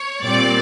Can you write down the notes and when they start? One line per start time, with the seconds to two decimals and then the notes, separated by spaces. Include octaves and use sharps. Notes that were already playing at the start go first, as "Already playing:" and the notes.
Already playing: C#5
0.22 A#2 G3 C4 D5